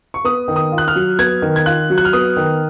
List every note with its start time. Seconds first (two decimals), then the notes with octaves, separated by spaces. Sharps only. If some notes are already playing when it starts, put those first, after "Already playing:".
0.14 C#6
0.25 B3 D#6
0.48 D#3
0.56 D#6
0.72 F4
0.78 F#6
0.88 F6
0.95 F#3
1.19 B3 G#6
1.42 D#3
1.56 G#6
1.66 F4 F#6
1.90 F#3
1.98 F#6
2.05 F6
2.13 B3 D#6
2.37 D#3